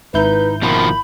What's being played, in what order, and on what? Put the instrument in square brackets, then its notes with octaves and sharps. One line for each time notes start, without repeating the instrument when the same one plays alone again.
[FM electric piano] G#1 E4 G6 [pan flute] D#4 [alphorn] B4
[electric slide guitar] B2 D#3 F3 [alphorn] A#3 [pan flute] B5